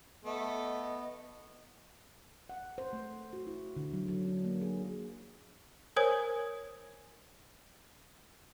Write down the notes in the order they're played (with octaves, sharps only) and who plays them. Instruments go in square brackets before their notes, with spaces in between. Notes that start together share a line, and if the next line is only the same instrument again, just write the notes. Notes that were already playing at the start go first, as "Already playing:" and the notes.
[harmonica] A3 [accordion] B3 [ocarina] D#5
[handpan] F#5
C5
A3
F#4
E4
D3
F#3
F#3
D4
A#3
G#4
[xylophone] A#4 C5 C#5 G#5 D#6 G#6